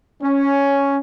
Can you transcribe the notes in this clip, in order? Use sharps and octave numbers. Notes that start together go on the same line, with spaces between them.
C#4